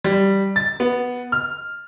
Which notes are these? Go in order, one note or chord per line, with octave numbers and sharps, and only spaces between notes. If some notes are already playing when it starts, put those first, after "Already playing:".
G3
A6
B3
F6